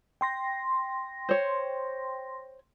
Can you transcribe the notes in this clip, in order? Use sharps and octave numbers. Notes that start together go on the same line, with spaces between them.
G5 C6 A#6
C5 C#5